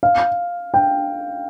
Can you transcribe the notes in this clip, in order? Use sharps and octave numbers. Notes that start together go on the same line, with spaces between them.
F5
G5